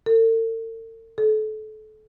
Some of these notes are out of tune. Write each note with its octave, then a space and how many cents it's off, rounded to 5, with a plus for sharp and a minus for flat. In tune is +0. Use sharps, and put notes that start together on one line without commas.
A4 +45
A4 -30